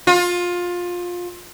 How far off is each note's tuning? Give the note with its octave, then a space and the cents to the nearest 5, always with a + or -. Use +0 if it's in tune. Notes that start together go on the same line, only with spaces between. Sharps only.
F4 +20